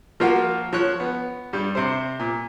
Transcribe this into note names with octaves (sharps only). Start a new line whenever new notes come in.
F3 A#3 F4 F#4
F3 C#5 F#6
B3
G2 G3
C3 C5
A#2